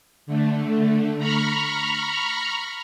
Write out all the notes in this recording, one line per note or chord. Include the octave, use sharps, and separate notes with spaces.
D3 A3
A#5 B5 C#6 F6